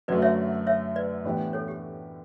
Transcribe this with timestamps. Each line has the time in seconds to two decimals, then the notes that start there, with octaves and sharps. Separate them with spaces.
0.08 F#2 D3 F#3 A3 B4 D5
0.22 C#5 E5
0.67 C#5 E5
0.96 B4 D5
1.24 A2 E3 B3 D4 G4
1.53 A4 C#5
1.68 G4